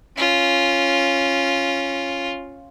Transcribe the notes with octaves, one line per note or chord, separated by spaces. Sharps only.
C#4 F4